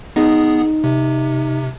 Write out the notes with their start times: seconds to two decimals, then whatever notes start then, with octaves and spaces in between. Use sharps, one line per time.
0.16 B3 D#4 G#4
0.84 C3